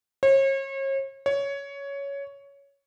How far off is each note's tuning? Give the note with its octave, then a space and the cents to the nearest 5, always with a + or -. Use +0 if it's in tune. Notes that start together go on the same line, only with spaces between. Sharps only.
C#5 -40
C#5 +10